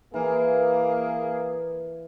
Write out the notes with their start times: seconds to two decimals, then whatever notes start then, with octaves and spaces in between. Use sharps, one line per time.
0.14 E3 A#3 G#4